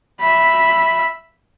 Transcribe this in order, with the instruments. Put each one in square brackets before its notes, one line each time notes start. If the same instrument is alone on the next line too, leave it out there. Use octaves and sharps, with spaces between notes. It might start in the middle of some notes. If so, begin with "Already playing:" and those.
[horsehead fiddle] E5 B5